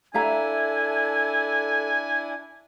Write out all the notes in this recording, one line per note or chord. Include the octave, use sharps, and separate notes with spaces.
D4 E4 A4 E5 F5 G#5 A#5